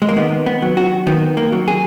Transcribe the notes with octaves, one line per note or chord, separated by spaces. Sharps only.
G#3
A#3
D#3 B3
B3
F#3
F#4
D#3 B3
A#3
F#3
G#4